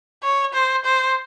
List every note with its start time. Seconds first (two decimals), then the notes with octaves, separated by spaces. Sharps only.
0.23 C#5
0.54 C5
0.85 C5